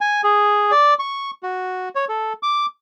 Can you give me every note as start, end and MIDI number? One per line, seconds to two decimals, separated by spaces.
0.01 0.21 80
0.24 0.71 68
0.71 0.94 74
0.99 1.31 85
1.43 1.89 66
1.95 2.05 73
2.09 2.33 69
2.43 2.66 86